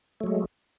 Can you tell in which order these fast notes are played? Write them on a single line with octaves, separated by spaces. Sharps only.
A3 F#3 G#3